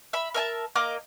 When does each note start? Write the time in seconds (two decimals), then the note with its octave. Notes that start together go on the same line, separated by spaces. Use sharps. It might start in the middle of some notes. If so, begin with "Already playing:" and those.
0.13 E5 B5
0.34 A#4 E5 G#5 A5
0.75 A#3 D#5 A#5 D6